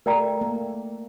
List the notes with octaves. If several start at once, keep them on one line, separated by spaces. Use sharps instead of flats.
A3 A#4 D5 G5 A#5
A#3